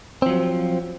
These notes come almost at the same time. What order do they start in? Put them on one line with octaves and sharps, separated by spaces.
C4 F3 F#3